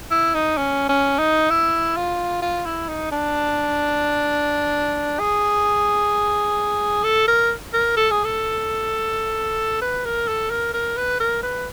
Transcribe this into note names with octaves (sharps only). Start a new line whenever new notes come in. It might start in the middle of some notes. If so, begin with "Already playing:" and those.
E4
D#4
C#4
C#4
D#4
E4
F4
F4
E4
D#4
D4
G#4
A4
A#4
A#4
A4
G#4
A4
B4
A#4
A4
A#4
A#4
B4
A#4
B4